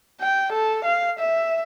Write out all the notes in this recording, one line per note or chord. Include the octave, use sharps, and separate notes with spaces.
G5
A4
F5
E5